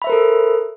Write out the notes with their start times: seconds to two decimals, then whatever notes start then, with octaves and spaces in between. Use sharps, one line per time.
0.02 B5
0.04 E5
0.07 C5
0.10 A#4
0.12 A4